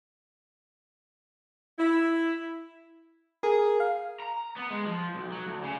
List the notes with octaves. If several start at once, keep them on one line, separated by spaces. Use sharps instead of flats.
E4
G#4 A#4
F5
A#5
B3
G#3
F3
B1
F#3
D2
C#3